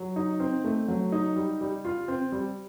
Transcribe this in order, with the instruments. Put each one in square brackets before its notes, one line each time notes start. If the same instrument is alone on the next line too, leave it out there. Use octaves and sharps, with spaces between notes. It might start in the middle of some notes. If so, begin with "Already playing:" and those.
Already playing: [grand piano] F#3
D#4
C4
A3
F#3
D#4
G3
G3
F4
C4
G3